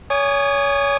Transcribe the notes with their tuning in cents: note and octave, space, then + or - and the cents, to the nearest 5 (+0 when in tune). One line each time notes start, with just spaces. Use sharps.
C#5 +25 G#5 -10 D#6 -30